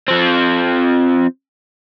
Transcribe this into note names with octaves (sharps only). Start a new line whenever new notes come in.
F3 C4